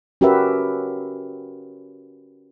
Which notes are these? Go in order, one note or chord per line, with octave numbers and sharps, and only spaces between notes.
C#4 F#4 G4 A#4 B4 E5